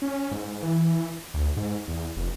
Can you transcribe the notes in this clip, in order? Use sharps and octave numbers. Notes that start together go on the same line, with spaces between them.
C#4
G#2
E3
D2
G#2
E2
F1